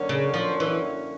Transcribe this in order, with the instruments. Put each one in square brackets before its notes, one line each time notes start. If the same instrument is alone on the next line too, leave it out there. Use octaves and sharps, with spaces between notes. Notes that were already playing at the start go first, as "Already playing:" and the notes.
Already playing: [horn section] F#2 D3 F#3 A#3 C#4
[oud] C#3
F3
E3